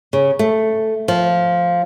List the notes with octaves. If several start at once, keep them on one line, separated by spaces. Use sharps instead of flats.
C#3
A3
F3